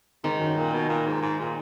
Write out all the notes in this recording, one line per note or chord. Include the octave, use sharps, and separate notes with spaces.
G#2 D#3
F#2
A#2
B2
A#2
G#2
G#2
A#2